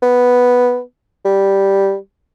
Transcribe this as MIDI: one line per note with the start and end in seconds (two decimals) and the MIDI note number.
0.02 0.80 59
1.25 1.95 55